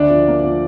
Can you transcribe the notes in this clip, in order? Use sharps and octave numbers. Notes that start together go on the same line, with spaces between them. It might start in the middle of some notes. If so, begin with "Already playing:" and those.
Already playing: D2 D4 D5
F3
A#3
F3